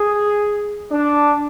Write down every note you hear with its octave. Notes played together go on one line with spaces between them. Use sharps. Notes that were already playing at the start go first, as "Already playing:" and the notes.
Already playing: G#4
D4